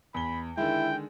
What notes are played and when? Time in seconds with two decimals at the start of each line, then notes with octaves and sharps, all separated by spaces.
0.14 E2 B5 G7
0.58 D3 D#3 G#3 E4 G5